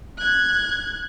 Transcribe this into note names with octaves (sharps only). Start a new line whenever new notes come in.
F#6 G#6